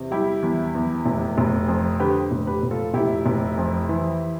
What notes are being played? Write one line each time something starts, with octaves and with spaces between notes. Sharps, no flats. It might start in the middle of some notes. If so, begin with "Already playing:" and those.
Already playing: E2 C3
G3 E4 G4
E2
E2
F1
F1
F2
D3 G4 B4
F1
G4 B4
F1
F4 A4
F1 E4 G4
F1
F2
E3